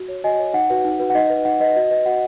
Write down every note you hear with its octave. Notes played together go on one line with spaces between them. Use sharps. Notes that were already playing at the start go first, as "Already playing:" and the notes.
Already playing: F#4
C#5
F#4 D#5 G#5
C#5
D#4 F#5
F#4 B4
D#4
F#4 B4
F#5
D#4 D#5
B4
D#4 F#5
B4 D#5
F#4 D#5
B4 D#5
F#4 F#5